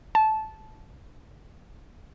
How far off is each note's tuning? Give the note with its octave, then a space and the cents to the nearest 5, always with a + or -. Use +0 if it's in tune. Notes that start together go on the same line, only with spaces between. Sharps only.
A5 -15